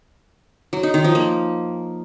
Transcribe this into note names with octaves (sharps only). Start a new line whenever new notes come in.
F#3
D#4
D#3
F3
A#3